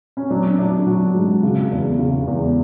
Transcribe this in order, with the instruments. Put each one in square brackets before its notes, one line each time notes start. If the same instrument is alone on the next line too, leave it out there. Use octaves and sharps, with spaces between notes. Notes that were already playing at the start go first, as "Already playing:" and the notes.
[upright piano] C#4
F#3 D4
F#3 D4
F#3 F#4
G#2
C#3
E2
C#3
E2